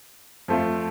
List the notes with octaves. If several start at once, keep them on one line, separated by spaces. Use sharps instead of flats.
F2 F3 A3 F4